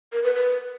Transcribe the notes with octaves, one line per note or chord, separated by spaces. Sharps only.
A#4
B4
B4